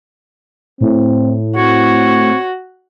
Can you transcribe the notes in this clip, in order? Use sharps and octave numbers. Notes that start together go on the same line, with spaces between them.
A2 C4
C4 F#4 C#5